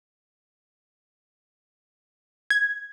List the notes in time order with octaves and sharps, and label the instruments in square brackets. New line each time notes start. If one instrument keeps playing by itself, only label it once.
[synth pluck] G#6